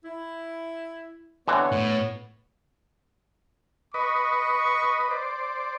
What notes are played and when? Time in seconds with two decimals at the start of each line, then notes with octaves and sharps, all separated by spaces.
0.05 E4
1.48 D3 E3 B3 C4 C#5
1.72 A2
3.94 B4 D#5 C#6
5.11 C5 D5